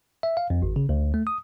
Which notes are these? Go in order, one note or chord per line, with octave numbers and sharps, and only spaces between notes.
E5
F5
F2
G#1
C#3
D2
A3
D#6